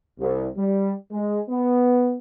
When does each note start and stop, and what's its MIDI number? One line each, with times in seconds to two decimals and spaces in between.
0.19 0.47 36
0.57 0.93 55
1.11 1.39 56
1.50 2.18 59